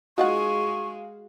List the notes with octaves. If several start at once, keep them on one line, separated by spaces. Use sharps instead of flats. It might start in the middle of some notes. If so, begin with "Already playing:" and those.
G#3 D#4 F4 F#4 G#4 F5 F#5 C#6